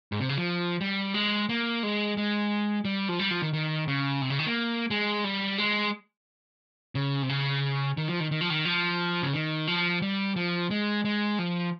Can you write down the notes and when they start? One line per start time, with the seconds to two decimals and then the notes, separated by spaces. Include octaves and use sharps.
0.12 G#2
0.20 C3
0.29 C#3
0.38 F3
0.81 G3
1.14 G#3
1.49 A#3
1.83 G#3
2.17 G#3
2.85 G3
3.08 F3
3.19 G3
3.31 F3
3.42 D#3
3.53 D#3
3.88 C#3
4.22 C3
4.30 C#3
4.39 D#3
4.47 A#3
4.90 G#3
5.24 G3
5.58 G#3
6.95 C#3
7.22 C3
7.29 C#3
7.97 D#3
8.08 F3
8.20 D#3
8.31 D#3
8.41 F3
8.50 D#3
8.65 F3
9.22 C#3
9.34 D#3
9.67 F3
10.02 G3
10.36 F3
10.70 G#3
11.05 G#3
11.39 F3